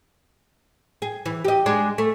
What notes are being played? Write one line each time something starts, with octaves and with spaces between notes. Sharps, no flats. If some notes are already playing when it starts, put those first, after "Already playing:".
G#4
E3
G4 D#5
G#3 D4 G#4
A3